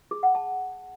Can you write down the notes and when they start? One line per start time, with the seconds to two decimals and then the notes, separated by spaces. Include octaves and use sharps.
0.11 G#4
0.23 F#5
0.35 A5